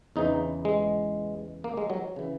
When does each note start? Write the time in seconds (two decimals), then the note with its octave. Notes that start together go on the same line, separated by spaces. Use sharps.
0.16 E2 C#3 E3 D#4
0.65 G#3
1.64 A#3
1.77 G#3
1.90 F#3
2.16 C#3 E3